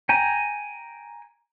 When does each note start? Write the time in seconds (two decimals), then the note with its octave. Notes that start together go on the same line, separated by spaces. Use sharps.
0.09 G5 G#5 A#5